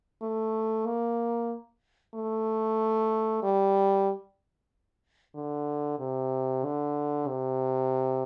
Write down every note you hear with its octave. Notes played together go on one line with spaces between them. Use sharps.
A3
A#3
A3
G3
D3
C3
D3
C3